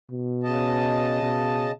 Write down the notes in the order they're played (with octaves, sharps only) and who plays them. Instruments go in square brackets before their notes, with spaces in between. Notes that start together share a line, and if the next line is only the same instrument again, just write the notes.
[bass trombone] B2
[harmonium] C#3 D#5 A5
[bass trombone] B2